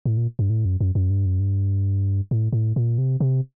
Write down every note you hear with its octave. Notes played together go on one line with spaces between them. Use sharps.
A2
A#2
G2
A2
F#2
F#2
F#2
G2
F#2
G2
A2
A2
A#2
C3
C3